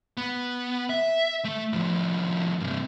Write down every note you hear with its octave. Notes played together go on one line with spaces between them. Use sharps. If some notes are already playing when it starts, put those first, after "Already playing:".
B3
E5
A3
A2 F3
G2 C3